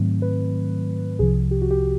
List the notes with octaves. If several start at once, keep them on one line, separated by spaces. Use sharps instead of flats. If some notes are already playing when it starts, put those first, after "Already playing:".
Already playing: G#2 D#3 F#3 A3 C4
B4
C2 C3 F3 G#4
G4
F#4
G4